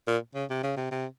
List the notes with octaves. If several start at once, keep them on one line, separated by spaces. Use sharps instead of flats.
A#2
C#3
C3
C#3
C3
C3